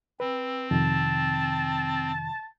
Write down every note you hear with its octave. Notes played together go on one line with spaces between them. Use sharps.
C4 B4
F2 C3 D#3 A5